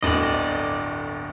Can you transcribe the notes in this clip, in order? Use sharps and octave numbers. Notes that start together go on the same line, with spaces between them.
D1 G1 D2 D5 D#5